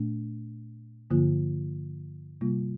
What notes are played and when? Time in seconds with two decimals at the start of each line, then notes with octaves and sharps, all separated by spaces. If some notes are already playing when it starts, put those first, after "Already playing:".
Already playing: A#2 A3 D4
1.10 G2 D3 F3 A#3 F4
2.41 C3 G3 A#3 F4